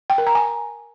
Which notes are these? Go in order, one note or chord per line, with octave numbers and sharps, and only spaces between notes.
G5
A#4
A#5
G#5